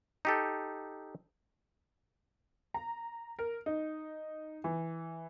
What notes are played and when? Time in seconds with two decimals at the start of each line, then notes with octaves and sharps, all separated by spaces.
0.25 D#4 G4 A4
2.74 A#5
3.39 A#4
3.66 D#4
4.64 E3